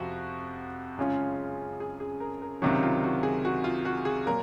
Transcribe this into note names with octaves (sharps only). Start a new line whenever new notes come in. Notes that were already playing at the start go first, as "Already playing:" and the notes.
Already playing: F2 C3 F3 F#4
F#2 C#3 G#3 C#4 F4
G#4
G#4
A#4
A#4
C#2 C3 D#3 F#3 F#4
F4
F#4
G#4
F#4
F4
F#4
G#4
A#2 F#3 A#3 A#4